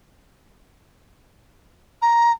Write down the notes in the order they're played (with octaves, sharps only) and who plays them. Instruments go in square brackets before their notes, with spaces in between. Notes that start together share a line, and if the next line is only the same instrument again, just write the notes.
[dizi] A#5